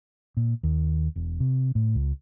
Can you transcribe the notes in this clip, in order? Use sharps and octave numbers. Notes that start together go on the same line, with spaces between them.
A#2
D#2
E1
C3
A2
C#2